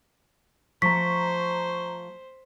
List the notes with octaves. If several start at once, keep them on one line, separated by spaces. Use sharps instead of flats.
F3 A3 C5 A#5 C#6 B6